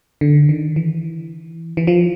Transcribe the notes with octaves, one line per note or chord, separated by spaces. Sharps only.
D3
D#3
E3
E3
F3